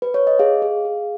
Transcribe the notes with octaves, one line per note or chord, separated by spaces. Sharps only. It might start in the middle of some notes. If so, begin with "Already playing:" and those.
B4
C#5
D#5
G#4 F5
G#4
G#4